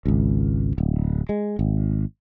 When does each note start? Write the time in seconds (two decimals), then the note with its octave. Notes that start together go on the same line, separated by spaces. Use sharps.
0.05 G#1 C#2
0.78 D1
1.29 G#3
1.59 G#1